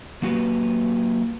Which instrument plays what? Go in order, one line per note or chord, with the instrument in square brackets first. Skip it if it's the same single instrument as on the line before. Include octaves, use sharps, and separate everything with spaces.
[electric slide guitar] F#3 A#3 F#4 G4 B4